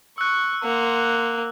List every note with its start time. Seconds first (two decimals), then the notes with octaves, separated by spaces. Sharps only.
0.18 C#6 E6 F#6
0.64 A#3 F#5 C6